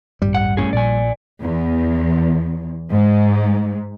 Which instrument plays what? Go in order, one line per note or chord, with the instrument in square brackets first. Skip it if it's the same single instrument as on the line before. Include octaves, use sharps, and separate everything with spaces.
[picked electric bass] D#1 A1 G2 [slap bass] G3
[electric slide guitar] F#5
A2 C#4 G#4
[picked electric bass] A#1 A#2 [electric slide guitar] D5 G#5
[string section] E2
G#2